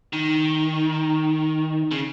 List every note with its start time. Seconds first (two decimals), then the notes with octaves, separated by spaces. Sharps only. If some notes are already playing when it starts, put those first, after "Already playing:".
0.13 D#3
1.91 C#3